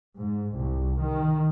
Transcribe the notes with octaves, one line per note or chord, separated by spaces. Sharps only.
G#2
C2
D#3